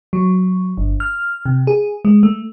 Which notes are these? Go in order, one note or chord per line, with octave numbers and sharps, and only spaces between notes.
F#3
G1
F6
C3
G#4
G#3
A3